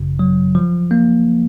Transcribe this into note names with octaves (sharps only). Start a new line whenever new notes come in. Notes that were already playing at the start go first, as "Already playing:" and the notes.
Already playing: G#1 F#2 C#3
F#3
F3
A#3